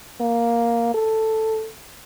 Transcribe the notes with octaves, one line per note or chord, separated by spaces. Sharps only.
A#3
A4